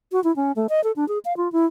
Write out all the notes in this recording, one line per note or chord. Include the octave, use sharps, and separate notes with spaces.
F#4
E4
C#4
A3
D#5
A4
D4
G#4
F5
F4
E4